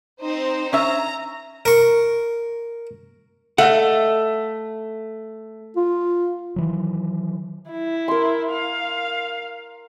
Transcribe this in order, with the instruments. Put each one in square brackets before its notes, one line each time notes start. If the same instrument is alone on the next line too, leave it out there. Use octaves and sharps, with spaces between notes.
[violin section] C4 D#4 C5
[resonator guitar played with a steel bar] C#4 E5 [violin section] A#5
[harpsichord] A#4 C#6
[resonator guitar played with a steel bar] A3 [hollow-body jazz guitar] D#5 F5 F#5
[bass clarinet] F4
[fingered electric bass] D#3 E3 F#3
[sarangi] E4
[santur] A#4 C6
[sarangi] F5